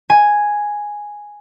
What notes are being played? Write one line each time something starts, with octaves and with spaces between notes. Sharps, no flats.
G#5